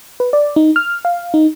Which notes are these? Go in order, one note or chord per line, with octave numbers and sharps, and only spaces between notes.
B4
D5
D#4
F6
F5
D#4